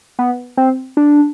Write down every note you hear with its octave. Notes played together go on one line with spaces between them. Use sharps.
B3
C4
D4